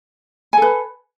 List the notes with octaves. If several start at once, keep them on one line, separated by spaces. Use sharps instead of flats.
A4 B4 G#5